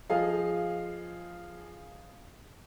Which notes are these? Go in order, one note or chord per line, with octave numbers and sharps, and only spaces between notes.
F3 G#4 D#5 F5